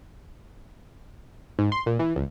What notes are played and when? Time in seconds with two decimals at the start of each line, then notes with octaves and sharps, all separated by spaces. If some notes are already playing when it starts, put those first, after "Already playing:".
1.59 G#2
1.72 C6
1.86 A#2
1.99 E3
2.16 C#2